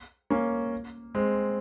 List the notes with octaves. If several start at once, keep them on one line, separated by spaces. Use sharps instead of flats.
A#3 C#4
G#3 C4